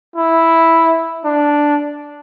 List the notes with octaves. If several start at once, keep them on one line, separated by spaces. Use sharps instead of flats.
E4
D4